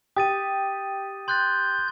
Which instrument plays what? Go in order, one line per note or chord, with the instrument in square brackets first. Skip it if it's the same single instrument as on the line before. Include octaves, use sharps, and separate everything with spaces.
[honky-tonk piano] G4 [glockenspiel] D#6 A6 D#7
[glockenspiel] C6 F#6 A6 [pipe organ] G6